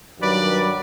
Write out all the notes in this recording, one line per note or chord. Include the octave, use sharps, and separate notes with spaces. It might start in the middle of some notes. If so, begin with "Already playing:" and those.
G2 D#3 F#3 B4 D5